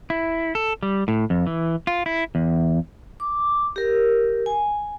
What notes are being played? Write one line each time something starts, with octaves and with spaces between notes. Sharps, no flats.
E4
A4
G3
A2
F2
E3
F4
E4
E2
D6
G4 A#4
G#5